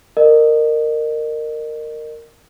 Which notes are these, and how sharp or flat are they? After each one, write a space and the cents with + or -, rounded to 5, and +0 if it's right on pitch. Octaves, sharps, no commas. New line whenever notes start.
A#4 -15 D#5 -35